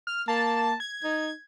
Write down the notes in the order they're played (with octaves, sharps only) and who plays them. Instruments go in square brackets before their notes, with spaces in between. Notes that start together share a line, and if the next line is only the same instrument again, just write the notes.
[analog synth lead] F6
[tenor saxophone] A#3 [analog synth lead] A5
[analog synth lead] G#6
[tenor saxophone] D#4